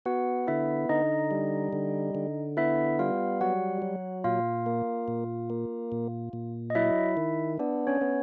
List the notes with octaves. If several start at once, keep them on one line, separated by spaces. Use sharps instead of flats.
B3 F#4 F#5
D3 E4 E5
D3 D#4 D#5
G3
D3
D3
B3 E4 E5
G3 F4 F5
F#3 F#4 F#5
F#3
A#2 F4 F5
A#3
A#2
A#3
A#2
A#2
D#5
F#3 E4 E5
D#3
B3 D4 D5
C#4 C#5
B3